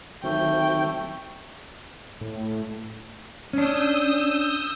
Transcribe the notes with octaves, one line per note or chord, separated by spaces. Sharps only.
D#3 F#3 A3 C4 G5
A2
C#4 D4 D#6 E6 G6